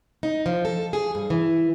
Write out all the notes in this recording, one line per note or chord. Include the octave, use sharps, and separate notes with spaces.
D#4
F3
A4
G#4
G2
E3